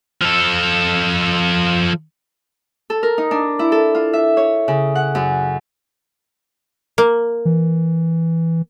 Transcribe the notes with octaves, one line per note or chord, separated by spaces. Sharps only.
F3 A4
A4
A#4
D#4
D4
E4
A4
F4
E5
C#5
C#3
F#5
F#2
A#3
E3